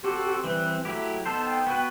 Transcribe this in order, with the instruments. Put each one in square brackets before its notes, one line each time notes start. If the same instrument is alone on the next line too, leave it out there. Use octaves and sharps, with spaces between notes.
[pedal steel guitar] C4 F#4 A4 [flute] G4
[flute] G4
[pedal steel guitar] E3 G3 C4 [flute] B4
[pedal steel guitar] F#3 A3 E4 G4
[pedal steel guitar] B3 D#4 A4 C5 [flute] A5
[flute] G5
[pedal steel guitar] B3 F#4 B4